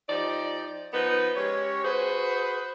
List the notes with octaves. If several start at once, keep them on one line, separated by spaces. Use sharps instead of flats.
F3 D#4 G4 D5
F3 B3 D#4 B4
G#3 C#4 G4 C#5
F#4 G#4 B4 C5